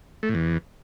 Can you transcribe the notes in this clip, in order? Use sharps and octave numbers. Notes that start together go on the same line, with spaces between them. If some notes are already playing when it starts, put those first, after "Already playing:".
A3
A2
E2